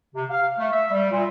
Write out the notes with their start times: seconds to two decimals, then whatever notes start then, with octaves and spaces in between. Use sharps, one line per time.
0.14 C3
0.30 F5
0.58 A3
0.72 E5
0.91 G3
1.11 A#2